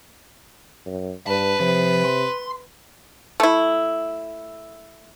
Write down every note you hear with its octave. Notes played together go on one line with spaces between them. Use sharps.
F#2
G2 B4 A5
C3 F3
C6
A3 E4